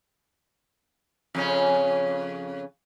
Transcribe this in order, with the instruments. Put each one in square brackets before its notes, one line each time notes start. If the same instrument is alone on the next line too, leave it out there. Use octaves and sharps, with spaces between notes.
[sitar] F2 C#3 C#4